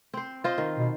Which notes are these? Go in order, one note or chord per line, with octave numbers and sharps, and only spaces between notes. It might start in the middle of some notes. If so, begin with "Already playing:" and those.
C4 C5
F4 C5 D#5
D#3
B2